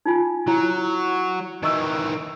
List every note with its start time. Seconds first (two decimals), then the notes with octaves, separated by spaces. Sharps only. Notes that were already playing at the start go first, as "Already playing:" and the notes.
0.06 D#4 F4 G#5
0.48 F#3 E4
1.63 D#3 E3 D#5 C#6 E6